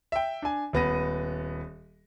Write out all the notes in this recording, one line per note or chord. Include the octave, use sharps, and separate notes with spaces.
E5 G5
D4 G#5
D#1 B3 A#6 D#7